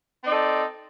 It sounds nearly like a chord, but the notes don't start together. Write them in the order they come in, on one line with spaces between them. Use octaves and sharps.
C4 D#4 D5 A4